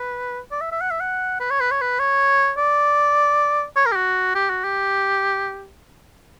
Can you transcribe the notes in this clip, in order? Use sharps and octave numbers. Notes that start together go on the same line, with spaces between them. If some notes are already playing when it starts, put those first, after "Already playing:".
Already playing: B4
D5
E5
E5
F#5
E5
F#5
B4
C#5
B4
C#5
B4
C#5
D5
C#5
A#4
G4
F#4
G4
F#4
G4